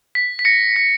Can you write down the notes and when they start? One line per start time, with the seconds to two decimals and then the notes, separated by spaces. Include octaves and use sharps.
0.15 B6
0.39 B6
0.45 A#6 C#7
0.76 B6